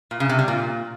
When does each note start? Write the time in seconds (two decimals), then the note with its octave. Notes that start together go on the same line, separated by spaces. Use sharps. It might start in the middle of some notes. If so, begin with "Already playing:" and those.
0.11 A#2
0.20 C#3
0.29 C3
0.39 G3
0.48 A#2